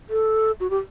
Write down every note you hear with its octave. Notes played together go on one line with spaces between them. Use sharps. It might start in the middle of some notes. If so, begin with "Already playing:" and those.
A4
F#4
G4